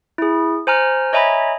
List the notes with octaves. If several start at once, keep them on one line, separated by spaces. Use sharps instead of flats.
E4 G#4
C5 G#5 A#5 F6
C#5 D#5 E5 G#5 A#5 B5